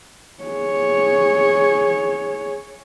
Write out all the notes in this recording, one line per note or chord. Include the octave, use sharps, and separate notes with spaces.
G#4 C#5